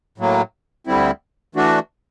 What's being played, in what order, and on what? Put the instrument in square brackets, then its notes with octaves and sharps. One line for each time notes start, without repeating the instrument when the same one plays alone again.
[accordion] A2 F#3 A#3
D2 D3 G3 C4 E4
E3 A3 D4 F#4